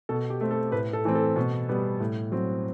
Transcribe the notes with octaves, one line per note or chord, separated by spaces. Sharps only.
B2 A4
G4
A3 C4
A4
A2 B4
A4
E3 A3 C4
A4
B2
G3 B3
A2
F#3 C4